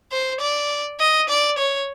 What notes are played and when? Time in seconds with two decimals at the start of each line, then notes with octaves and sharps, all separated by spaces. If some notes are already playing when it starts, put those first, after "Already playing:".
0.12 C5
0.40 D5
1.00 D#5
1.29 D5
1.58 C#5